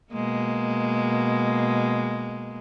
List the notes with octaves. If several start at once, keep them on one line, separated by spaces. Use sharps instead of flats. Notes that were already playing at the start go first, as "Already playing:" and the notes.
B2 G#3 A#3